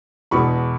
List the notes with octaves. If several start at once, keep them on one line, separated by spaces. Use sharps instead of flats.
E2 B2 G#3 B3 B5 C#6